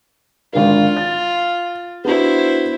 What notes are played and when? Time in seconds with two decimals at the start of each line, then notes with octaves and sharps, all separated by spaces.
0.53 G#1 D3 F4 A#4
0.97 A6
2.05 B3 D4 E4 F#4 C5